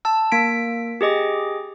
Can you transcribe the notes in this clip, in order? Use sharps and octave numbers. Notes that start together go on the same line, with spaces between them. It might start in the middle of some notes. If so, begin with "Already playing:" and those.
A5 E6
A#3 B6 D7
G4 G#4 D#5 D6